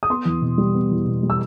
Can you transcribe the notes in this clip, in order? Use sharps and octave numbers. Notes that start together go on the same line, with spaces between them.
D#6
B3 C6
E2
B2
G3
B3
E2
B2
G3
E6